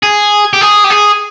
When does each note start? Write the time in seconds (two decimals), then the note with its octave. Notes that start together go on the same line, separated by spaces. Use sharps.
0.03 G#4
0.53 G4
0.61 G#4
0.84 G4
0.91 G#4